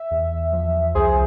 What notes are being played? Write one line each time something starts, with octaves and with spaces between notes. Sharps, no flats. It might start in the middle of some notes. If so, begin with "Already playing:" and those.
Already playing: E5
E2
F3
C2 G#4 C5